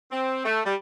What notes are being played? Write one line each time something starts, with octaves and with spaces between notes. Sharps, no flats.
C4
A3
G3